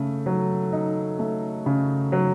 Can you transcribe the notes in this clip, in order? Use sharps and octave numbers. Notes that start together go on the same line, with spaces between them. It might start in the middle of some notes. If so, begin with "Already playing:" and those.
Already playing: C#3 A3
F#3
D#4
A3
C#3
F#3